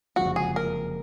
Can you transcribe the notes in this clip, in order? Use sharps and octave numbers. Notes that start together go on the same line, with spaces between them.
F#1 F2 D3 F3 G#3 F#4
G#4
A#4